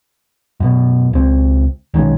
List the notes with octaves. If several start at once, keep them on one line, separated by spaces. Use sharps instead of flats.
F#2 B2
C#2 C4
B1 D#3 G#3 C#4